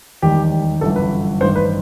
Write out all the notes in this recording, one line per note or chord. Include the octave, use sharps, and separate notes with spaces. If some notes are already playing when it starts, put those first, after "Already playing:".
E1 D#2 D#3 G3 G4
G1 F#2 E3 A4
B4
A1 G2 D#3 C5
B4